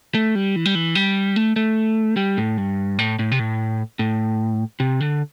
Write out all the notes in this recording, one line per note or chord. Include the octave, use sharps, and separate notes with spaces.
A3
G3
E3
G3
E3
G3
A3
A3
G3
A2
G2
A2
A2
C3
A2
A2
C3
D3